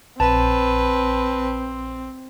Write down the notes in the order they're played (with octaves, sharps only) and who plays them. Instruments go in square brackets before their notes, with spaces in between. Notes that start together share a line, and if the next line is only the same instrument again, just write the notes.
[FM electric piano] A#1 [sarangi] C4 [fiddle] B4 [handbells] A5